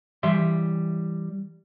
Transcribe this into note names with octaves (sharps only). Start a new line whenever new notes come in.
E3 G3 E5 C6